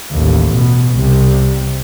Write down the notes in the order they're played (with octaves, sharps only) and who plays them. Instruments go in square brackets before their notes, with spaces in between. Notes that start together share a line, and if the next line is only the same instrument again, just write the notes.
[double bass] A1 D#2
B2
C2 C3